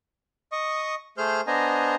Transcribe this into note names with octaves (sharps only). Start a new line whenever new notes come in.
D#5 C#6 D#6
A3 G#4 C5 F6 G6
B3 D4 C5 D#5 G#5 A#5